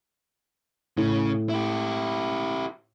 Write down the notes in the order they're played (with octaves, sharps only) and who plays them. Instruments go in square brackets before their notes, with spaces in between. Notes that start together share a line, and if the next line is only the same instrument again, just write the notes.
[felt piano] A2 [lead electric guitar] C#3
[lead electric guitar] E4 G4